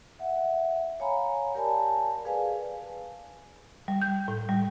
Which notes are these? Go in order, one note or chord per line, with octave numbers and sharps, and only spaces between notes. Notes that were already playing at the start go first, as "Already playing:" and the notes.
E5 F#5
C#5 F5 G#5 A#5 B5
G4 A#4 D5 G#5 A5
G#4 B4 D5 F5 G#5
G3
G6
A2
G3